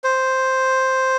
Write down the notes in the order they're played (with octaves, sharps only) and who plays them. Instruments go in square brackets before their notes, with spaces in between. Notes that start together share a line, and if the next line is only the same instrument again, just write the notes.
[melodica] C5